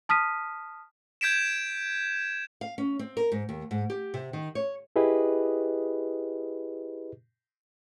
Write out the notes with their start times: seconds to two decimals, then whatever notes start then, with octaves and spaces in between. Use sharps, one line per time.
0.09 A5 D#6 F6 B6 D#7
1.21 G6 G#6 B6 D7 E7
2.61 F5
2.78 C#4
2.99 C4
3.17 A#4
3.32 G#2
3.49 D#2
3.71 G#2
3.90 G4
4.14 C3
4.33 D#3
4.55 C#5
4.96 E4 G4 G#4 B4 D#5